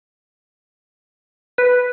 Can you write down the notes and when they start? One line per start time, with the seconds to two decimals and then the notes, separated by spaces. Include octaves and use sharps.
1.58 B4